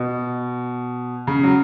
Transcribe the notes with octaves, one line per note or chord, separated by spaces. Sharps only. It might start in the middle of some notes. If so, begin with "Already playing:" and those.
Already playing: B2
C#3
F#3